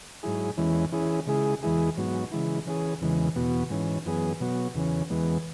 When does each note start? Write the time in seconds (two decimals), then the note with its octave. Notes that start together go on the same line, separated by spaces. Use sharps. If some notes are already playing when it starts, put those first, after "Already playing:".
0.23 G#2 F#3 E4 G#4
0.57 E2 E3 G#3 C#4 E4
0.92 E3 C#4 E4 G#4
1.27 C#3 G#3 E4 G#4
1.63 E2 E3 G#3 E4 G#4
1.97 G#2 F#3 B3 F#4
2.32 C#3 E3 G#3 E4
2.66 E3 C#4 G#4
3.01 E2 C#3 E3 G#3
3.36 E2 B2 B3 F#4
3.70 G#2 E3 C#4
4.06 F#2 E3 B3 G#4
4.40 B2 F#3 B3 F#4
4.75 E2 C#3 E3 C#4
5.10 E2 E3 G#3 B3